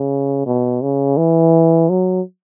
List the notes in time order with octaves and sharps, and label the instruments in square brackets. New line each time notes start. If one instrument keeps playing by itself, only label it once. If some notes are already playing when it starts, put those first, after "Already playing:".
Already playing: [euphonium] C#3
B2
C#3
E3
F#3